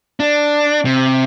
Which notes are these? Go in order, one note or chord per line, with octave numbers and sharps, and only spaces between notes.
D4
C3